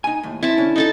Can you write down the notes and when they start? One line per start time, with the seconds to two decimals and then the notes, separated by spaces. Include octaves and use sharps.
0.04 D#4 G#5
0.23 D#2 A2
0.43 C4 E4 A5
0.58 D3 C#4
0.76 D#4 A4 A5